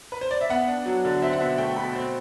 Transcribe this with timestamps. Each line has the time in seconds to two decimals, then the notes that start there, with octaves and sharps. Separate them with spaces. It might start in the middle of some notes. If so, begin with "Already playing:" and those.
0.12 B4
0.21 C5
0.31 D5
0.41 E5
0.49 B3 F#5
0.68 D4
0.86 F#3
1.05 D3
1.22 C4 E5
1.33 F#5
1.40 B2 E5
1.58 A3 G5
1.76 B2 B5
1.95 C4